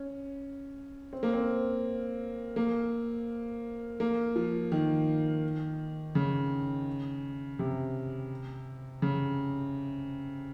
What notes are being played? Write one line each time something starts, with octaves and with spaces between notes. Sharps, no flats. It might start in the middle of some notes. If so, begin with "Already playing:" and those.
Already playing: C#4
C4
A#3
C4
A#3
A#3
F3
D#3
C#3
C3
C#3